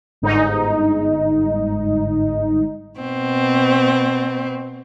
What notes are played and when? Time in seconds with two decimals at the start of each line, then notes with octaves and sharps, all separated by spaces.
0.22 G1 G#2 D#4
2.99 B2 C4